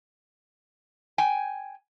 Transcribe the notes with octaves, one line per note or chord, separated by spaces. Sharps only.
G5 G#5